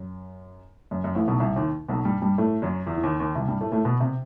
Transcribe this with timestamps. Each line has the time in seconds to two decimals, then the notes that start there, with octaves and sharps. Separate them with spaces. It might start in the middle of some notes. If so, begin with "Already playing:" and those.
Already playing: F#2
0.91 F#2
1.04 F#2
1.15 A1 A2
1.28 B1 B2
1.40 C2 C3
1.56 D#2 D#3
1.88 B1 B2
2.05 G2 G3
2.22 G2 G3
2.38 A2 A3
2.62 F#2 F#3
2.86 E2 E3
2.97 E3
3.03 D#2 D#3
3.20 D#2 D#3
3.35 C2 C3
3.48 G2 G3
3.61 A2 A3
3.72 A2 A3
3.85 B2 B3
4.00 C3 C4